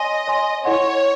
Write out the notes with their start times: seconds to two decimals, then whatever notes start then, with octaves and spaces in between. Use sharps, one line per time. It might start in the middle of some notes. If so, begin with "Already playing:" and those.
Already playing: C#5 D#5 G#5 C6
0.28 C#5 G#5 C6
0.65 E4 A4 C#5 D#5 F#5 C6